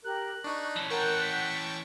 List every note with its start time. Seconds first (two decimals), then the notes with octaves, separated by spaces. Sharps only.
0.04 G4 A#4 F#6
0.44 D4 D#4 C#6
0.76 E3 C#4 A5
0.90 A#4 F#5 G5 A5 C#6 F#6 G6
1.21 B6